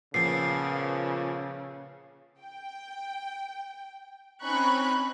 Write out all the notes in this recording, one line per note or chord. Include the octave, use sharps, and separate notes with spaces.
A#2 C#3 F3 B3 C7
G5
C4 C#4 D#4 B5 C#6 F#6